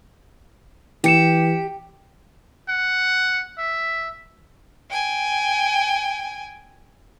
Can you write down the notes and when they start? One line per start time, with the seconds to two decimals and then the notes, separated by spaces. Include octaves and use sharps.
1.04 E3 E4 G4 C#7 E7
2.69 F#5
3.58 E5
4.88 G5 G#5